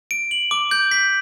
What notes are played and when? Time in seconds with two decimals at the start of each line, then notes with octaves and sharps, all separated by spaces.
0.11 D7
0.31 F#7
0.51 D6
0.71 G6
0.91 B6